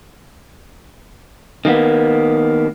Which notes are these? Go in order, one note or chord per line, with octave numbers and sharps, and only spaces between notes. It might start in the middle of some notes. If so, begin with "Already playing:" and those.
D#3 A#3 B3